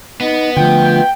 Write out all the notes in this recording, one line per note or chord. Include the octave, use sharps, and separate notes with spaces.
B3 D#4 D#5
D3 F3 A3 F4 G5